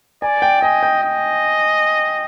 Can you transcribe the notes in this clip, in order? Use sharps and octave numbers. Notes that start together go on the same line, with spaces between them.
D5 G#5
G5
D#5 G#5
G5
D#5